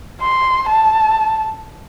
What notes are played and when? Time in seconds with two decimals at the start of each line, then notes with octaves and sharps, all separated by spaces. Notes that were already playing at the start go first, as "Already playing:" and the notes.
0.21 C6
0.69 A5